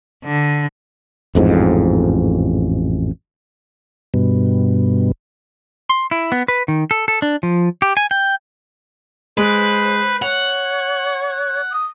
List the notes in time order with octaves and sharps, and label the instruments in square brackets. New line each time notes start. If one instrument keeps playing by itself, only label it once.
[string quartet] D3
[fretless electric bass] A1 F2 G#2
[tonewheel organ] G2 B2
[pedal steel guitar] C6
E4
B3
B4
D#3
A4
A4
D4
F3
G4
G#5
G5
[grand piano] G#3 [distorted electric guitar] B4 [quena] C5
[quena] C#5 [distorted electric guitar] F#5 [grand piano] F7
[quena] D#6